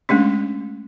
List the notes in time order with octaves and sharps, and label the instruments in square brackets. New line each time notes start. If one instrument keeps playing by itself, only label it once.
[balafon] G#3 A3 C#4 D4